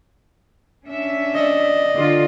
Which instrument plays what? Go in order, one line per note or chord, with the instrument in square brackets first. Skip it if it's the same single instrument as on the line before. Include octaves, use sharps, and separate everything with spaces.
[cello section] C#4 D4 E5
[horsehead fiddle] D5 D#5
[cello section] D3 F4